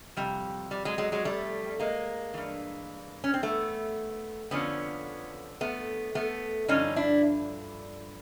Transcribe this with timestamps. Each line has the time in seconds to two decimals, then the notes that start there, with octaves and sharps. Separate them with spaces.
0.17 F2 C3 G3
0.71 G3
0.85 F#3 G#3
0.98 F#3 G#3
1.12 F#3 G#3
1.25 G3 A3
1.79 G#3 A#3
2.34 G2 E3
3.24 C#4
3.34 C4
3.43 A3 B3
4.51 F2 D3 F3 B3 C#4
5.61 A3 B3
6.15 A3 B3
6.68 G2 D3 F3 C#4 D#4
6.96 D4 E4